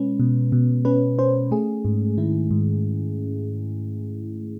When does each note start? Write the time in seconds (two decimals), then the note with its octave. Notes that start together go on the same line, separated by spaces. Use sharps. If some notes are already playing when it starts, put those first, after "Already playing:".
Already playing: B2 G#3 C#4 B4
0.20 B2
0.52 B2
0.85 C#4 B4
1.19 C#4 C5
1.51 A3 G#4
1.85 G#2
2.18 D#3 E4
2.51 G#2